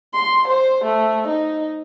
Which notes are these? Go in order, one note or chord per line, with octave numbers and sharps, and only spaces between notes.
C6
C5
A3
D#4